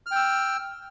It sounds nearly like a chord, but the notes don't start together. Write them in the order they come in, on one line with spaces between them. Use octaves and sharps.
F6 G5 E6